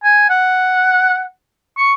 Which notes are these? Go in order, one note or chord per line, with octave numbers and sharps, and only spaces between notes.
G#5
F#5
C#6